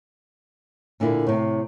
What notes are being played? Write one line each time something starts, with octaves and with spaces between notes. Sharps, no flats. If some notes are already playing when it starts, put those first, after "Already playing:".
A#2 D3 A#3 E4
A2 C3